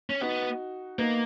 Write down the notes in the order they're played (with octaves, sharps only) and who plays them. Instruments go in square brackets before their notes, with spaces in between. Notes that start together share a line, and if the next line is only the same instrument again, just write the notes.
[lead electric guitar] C#4
[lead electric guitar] B3 [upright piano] D#4 F#4
[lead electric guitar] A#3 [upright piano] B3 D#4